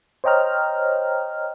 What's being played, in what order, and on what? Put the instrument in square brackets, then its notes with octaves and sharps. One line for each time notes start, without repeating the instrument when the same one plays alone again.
[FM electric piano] C5 C#5 D#5 G5 A#5 F6